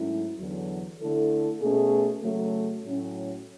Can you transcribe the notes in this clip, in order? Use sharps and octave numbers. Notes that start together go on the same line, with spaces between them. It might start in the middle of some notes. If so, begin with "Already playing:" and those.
Already playing: G#2 F#3 A3 C#4 E4
E2 D3 F#3
D3 A3 E4 A4
B2 A3 C#4 G#4
C#3 F#3 A3
A2 F#3 C#4